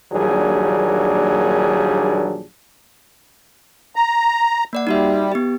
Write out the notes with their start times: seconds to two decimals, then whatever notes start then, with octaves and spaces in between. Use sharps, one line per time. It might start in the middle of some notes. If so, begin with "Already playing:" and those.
0.12 A#1 D#2 F#3 G3 D4 G#4
3.96 A#5
4.73 A#3 D5 F#5
4.87 G3 D#4 F#4 E5
5.32 B3 G4